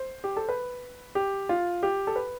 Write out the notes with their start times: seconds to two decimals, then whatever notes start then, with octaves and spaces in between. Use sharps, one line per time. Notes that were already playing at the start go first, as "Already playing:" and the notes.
Already playing: C5
0.24 G4
0.37 A4
0.49 B4
1.15 G4
1.49 F4
1.83 G4
2.07 A4
2.16 B4